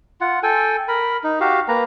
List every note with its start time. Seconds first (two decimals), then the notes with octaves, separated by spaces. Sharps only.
0.21 F4 F#5
0.43 A4 G5 G#5
0.88 A#4 B5
1.24 D#4
1.40 F#4 G4 F5
1.68 A#3 B4 A#5